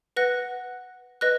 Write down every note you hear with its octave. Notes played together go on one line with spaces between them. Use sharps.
B4 F#5 F#6 A#6
B4 D#5 F#6 A#6